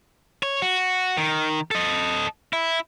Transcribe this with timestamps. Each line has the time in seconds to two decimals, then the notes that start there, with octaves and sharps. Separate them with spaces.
0.43 C#5
0.62 F#4
1.17 D#3
1.71 A4 D#5
2.53 E4